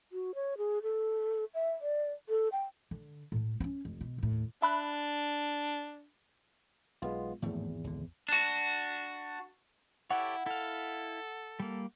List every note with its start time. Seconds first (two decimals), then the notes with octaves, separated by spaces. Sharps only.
0.12 F#4
0.35 C#5
0.58 G#4
0.83 A4
1.54 E5
1.81 D5
2.29 A4
2.52 G5
2.91 D3
3.32 A2 A3
3.60 C4 C#4
3.85 F1
4.01 B2
4.18 D#2 A2
4.62 D4 E5 B5 F#6
7.02 B1 G#3 B3 F4
7.42 G#1 E2 A2 F3 A3
7.84 C#2 D3
8.29 D4 F#4
10.10 E4 G4 A4 C#5 F#5
10.46 E4 A4 F5
11.60 G3 A#3